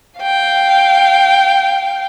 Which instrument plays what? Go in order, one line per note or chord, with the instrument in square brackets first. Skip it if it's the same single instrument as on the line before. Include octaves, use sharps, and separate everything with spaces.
[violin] F5 G5